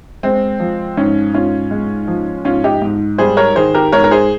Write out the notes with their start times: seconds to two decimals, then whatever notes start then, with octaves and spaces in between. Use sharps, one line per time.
0.23 G#3 C4
0.60 F3
0.97 G#2 C#4
1.34 G#2 C#4 F4
1.71 G#3
2.08 F3
2.45 G#2 C#4 F4
2.64 D#4 G4
2.82 G#2
3.18 G3 G#4 C5
3.37 A#4 C#5
3.56 D#3 G#4 C5
3.75 G4 A#4
3.92 G#2 A#4 C#5
4.04 A#4
4.11 G#4 C5